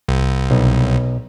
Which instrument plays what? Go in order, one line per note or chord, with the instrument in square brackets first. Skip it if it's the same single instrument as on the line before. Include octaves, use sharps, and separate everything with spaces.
[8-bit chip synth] C2
[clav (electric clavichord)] B1